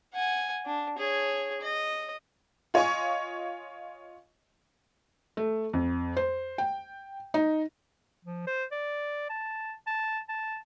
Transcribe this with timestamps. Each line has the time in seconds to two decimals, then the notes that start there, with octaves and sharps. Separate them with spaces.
0.13 F#5 G#5
0.66 D4
0.98 G#4 C#5
1.61 D#5
2.74 F4 C#5 D#5 G#5 C#6
5.37 A3
5.73 F2
6.17 C5
6.58 G5
7.34 D#4
8.25 F3
8.47 C5
8.72 D5
9.30 A5
9.87 A5
10.29 A5